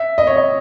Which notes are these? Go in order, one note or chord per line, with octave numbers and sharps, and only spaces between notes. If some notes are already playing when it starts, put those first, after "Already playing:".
Already playing: E5
D#5
C#5
D#5